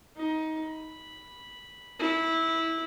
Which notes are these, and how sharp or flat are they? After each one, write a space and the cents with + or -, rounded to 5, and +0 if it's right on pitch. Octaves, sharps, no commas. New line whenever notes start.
D#4 +20
B5 -5
E4 -15